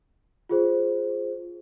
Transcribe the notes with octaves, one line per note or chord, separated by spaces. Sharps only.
F4 G#4 C5